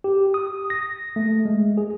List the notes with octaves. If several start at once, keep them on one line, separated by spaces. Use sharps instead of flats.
G4
D#6
A#6
A3
G#3
G#4